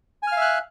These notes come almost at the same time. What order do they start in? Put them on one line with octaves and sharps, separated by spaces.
G#5 F6 F5 E5 F#6